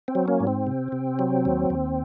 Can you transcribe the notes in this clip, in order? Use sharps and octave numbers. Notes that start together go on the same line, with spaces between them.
C4
F#3
A#3 C#4
G#2
C4
C3
C3
F#3
D#2
D#2